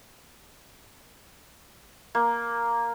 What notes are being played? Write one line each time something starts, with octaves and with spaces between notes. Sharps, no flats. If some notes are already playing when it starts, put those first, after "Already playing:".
A#3